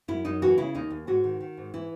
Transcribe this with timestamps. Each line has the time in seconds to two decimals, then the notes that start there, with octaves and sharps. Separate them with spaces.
0.08 F#2 E4
0.25 F#2 D#4
0.42 E3 F#4
0.58 C#3 E4
0.74 D#2 D#4
0.90 D#2
1.07 G#2 F#4
1.24 D#3
1.40 D#3
1.57 G#2
1.74 E3 E4